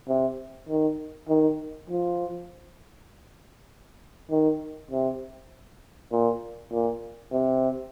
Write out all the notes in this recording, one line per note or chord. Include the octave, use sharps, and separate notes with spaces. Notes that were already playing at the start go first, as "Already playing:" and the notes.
C3
D#3
D#3
F3
D#3
C3
A#2
A#2
C3